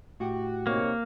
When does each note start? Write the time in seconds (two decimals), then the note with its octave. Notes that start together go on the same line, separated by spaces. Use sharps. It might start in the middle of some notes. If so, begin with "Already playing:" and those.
0.20 A2 F#4 G4
0.67 C3 D#3 A#3 C#5